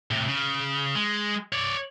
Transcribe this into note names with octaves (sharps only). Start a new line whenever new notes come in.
A2 C3
C#3
G#3
C#5 D5